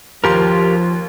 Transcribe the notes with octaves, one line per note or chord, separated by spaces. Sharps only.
D#2 F3 G4 A#4 C6